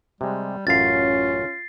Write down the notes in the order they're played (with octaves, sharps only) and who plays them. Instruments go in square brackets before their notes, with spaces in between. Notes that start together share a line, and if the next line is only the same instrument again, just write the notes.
[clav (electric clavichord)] C3 G#3 [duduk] G3
[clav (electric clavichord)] A1 F#2 F5 [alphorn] C#4 [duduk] F4 [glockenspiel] A6 C7